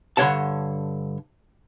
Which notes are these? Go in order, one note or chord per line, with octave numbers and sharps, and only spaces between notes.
G2 D3 G3 C#5 F#5 A5